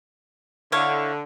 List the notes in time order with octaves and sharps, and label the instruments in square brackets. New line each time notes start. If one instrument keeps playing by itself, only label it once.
[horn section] D3 [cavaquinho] E4 C#5 F5